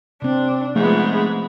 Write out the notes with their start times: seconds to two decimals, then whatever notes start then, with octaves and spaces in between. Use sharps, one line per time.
0.22 C3 C4 D4
0.76 G#2 F3 G#3 A3 B3